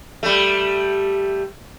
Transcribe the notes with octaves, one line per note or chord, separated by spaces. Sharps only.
G3 A3